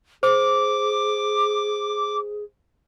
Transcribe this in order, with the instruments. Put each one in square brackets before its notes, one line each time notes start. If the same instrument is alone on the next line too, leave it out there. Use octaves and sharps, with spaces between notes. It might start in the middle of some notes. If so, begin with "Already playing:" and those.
[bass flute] G#4 [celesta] C5 [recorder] D6